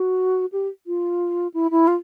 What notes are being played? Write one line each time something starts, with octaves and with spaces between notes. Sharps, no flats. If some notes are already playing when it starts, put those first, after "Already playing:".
Already playing: F#4
G4
F4
E4
E4
F4